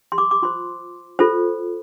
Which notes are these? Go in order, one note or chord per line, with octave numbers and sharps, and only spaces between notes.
C6
D6
D6
F4 C5 C6
F4 A4 C5